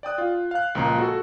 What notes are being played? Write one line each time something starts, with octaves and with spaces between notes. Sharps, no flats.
D5 G5 D#6 F#6
F4
F5 F#6
C#2 A#2 F3 A#5
F#4 G#4 A4